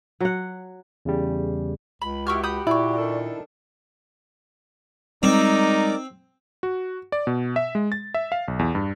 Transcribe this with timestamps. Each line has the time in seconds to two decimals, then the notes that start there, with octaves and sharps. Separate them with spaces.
0.20 F#3 F#5
1.05 E2 C#3 G3
2.02 C#2 B5
2.27 E4 F#4 G4 C#6 F6
2.44 B5 D#6 G6
2.67 A#2 E4 D5 C#6
2.97 D#3 D4 A4
5.23 G3 G#3 C4 D#4 A#4 D5 D6
6.63 F#4
7.12 D5
7.27 B2
7.56 E5
7.75 G#3
7.92 A6
8.14 E5
8.32 F5
8.48 B1
8.59 E2
8.75 G2